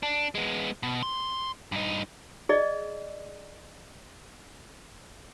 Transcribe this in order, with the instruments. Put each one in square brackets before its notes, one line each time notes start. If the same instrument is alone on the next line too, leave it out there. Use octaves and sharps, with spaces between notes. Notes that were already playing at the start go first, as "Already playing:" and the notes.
[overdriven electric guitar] D4
G#3 B3
B2
C6
G2 D#4
[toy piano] G#4 D5 D#5